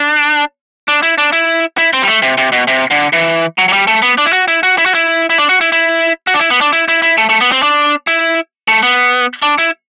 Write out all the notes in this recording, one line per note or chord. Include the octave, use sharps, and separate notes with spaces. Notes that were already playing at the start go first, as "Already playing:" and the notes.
Already playing: D4
D4
E4
D4
E4
E4
C4
G3
A3
C3
C3
B2
C3
D3
E3
F#3
F#3
G3
A3
B3
D4
E4
F#4
E4
F#4
E4
F#4
E4
E4
D4
F#4
E4
E4
F#4
D4
E4
B3
D4
E4
E4
E4
A3
A3
B3
C4
D4
E4
A3
B3
D4
E4